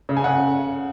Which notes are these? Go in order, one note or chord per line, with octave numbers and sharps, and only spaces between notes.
C#3
G#5
C#3 F#5